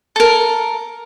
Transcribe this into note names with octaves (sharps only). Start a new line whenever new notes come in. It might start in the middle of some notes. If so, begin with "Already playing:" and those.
A4 A#4